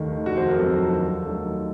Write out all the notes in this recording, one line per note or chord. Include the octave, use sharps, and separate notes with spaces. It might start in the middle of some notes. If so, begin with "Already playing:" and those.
Already playing: D#2 D#3 A3
F1 F#4
C5
A#4
F2 D#3 F#3 A4
D#2
D#3 F#3 A3